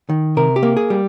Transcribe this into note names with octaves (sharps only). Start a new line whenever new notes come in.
D#3
C3 A#4
G4
A#3
G#4
G3